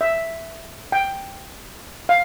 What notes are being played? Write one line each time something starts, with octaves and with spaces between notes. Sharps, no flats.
E5
G5
F5